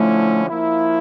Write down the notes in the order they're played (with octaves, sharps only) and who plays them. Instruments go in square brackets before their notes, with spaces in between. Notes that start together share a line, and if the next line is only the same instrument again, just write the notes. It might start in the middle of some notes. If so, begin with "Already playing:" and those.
Already playing: [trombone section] D3 F3 C#4 E4 [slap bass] A3
[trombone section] F3 A#3 E4